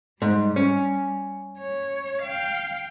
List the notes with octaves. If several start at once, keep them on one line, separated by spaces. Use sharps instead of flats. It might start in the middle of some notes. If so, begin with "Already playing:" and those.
G#2 G3
C#4
C#5
F5 G5